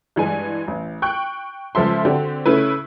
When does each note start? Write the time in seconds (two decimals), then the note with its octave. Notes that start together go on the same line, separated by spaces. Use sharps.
0.16 G2 E3 G#3 G#5
0.68 A1
1.02 G5 C#6 F#6
1.75 C#2 F3 A4 E5 C6
2.05 D3 C4 F#4 G4
2.46 C#3 A3 C#4 E4 B4